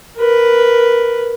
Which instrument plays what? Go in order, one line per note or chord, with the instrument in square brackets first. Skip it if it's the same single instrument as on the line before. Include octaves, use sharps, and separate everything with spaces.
[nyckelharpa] A#4 B4